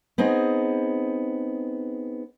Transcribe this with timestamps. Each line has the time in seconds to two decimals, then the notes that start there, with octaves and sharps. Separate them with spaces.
0.18 B3 C4 D#4 G#4